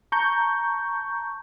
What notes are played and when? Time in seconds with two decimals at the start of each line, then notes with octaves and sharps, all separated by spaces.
0.12 A5 A#5 C#6 G6